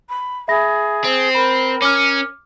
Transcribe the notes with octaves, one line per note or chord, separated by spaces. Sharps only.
B5
G#4 E5 B5 A#6
C4
A#4 B5
C#4 D6 F6